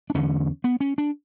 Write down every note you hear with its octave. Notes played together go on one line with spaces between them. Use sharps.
D4
E2 D3 C#4
B3
C#4
D4